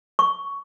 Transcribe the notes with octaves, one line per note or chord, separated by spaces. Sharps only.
C#6